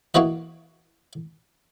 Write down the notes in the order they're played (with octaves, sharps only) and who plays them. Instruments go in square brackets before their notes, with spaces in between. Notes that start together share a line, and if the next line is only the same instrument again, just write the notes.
[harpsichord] E3 A#3 F#4 B4 D#5